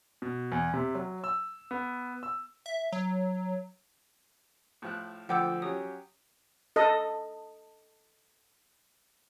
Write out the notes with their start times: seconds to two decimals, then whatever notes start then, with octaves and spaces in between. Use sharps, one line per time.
0.22 B2
0.52 E2
0.74 C3
0.95 F#3
1.24 E6
1.71 B3
2.23 E6
2.66 E5
2.92 F#3
4.82 A2 F3 F#6
5.29 D2 F3 A4 F#5 G5 D6 E6
5.62 F#3 C#4 G4 D#6
6.76 A4 D#5